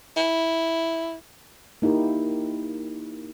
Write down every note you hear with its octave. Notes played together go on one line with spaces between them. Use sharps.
E4
A#3 D#4 E4 G4 A#4